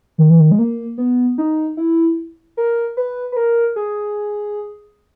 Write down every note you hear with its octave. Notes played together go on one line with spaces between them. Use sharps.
D#3
E3
D#3
G#3
A#3
B3
D#4
E4
A#4
B4
B4
A#4
G#4